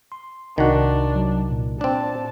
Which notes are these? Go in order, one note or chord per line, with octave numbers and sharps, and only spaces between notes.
C6
C2 D#3 D4 F#4
F#3
A#2
C4 D4 A5